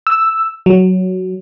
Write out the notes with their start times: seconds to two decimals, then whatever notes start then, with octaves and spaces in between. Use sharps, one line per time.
0.07 E6
0.66 F#3